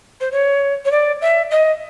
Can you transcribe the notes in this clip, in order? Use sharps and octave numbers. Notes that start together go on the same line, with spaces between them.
C5
C#5
C#5
D5
E5
D#5